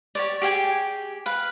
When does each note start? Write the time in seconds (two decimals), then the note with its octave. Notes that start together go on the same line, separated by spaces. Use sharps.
0.15 G4 C#5 D5
0.42 G4 G#4 G5 G#5
1.26 B4 F5